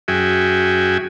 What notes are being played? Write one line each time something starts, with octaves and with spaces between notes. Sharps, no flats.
F#2 F#4 G#4 E5 G5 G#5